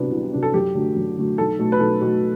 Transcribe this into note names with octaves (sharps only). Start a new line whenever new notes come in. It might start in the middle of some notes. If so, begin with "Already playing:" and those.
Already playing: C2 C3 F#3 B3 D4
C2
C3 F#3 B3 D4
A4
F#2 G4
D3 F#3 A3
F#2
D3 F#3 A3
B1 A4
B2 A3
B4
B1 A4
B2 A3